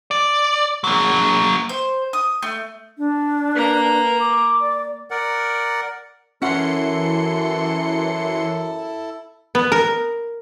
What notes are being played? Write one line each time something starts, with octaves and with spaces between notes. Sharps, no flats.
D5
F#3 A#3
C5
D#6
A3
D4
A#3 B4 A#5
D6
D5
A#4 D5 F#5
F#2 E3 C#4 E4 A4 F#5 C6 C#7
B3
A#4